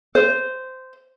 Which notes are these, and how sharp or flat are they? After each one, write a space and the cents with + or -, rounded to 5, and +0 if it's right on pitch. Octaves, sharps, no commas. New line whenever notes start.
C5 -15